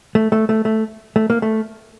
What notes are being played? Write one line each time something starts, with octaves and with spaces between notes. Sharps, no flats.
A3
A3
A3
A3
A3
A#3
A3